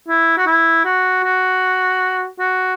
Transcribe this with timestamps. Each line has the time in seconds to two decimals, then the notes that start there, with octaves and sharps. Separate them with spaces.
0.08 E4
0.37 F#4
0.46 E4
0.85 F#4
1.23 F#4
2.39 F#4